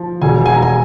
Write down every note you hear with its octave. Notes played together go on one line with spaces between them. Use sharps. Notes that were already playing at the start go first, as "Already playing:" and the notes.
Already playing: F3
E1 G#5
G#5
A#5
G3 G#5